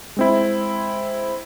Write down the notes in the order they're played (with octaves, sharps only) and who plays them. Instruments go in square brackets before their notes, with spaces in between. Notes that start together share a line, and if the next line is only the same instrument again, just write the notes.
[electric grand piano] G#3 C4 E4